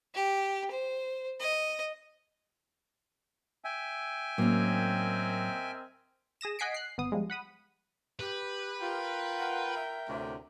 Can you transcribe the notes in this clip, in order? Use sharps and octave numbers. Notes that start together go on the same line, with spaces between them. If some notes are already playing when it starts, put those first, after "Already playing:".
G4
C5
D#5
E5 G5 G#5
A2 F#3 A#3 C4 C#4 A#4 D#5
G#4 D#6 A#6 E7
D#5 F#5 G#5 B6 C7 D7
F#6 C7
G1 B3 D#6
F3 G3 G#3
F#5 B5 D#6
G4 B4
F4 A#4 G5
F#5
E5
D2 A2 C3